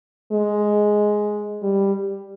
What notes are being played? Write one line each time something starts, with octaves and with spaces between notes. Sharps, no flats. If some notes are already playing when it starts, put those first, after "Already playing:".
G#3
G3